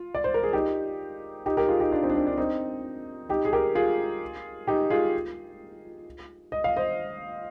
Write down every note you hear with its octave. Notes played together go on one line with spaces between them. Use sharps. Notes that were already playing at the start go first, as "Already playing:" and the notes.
Already playing: F4
D5
C5
A#4
G#4
D#4 G4
D#4 G4
G4 A#4
F4 G#4
D#4 G4
D4 F4
C4 D#4
D4
C4
D4
C4 D#4
D#4 G4
G#4
G4 A#4
F4 G#4
D#4 G4
F4 G#4
D#5
F5
C5 D#5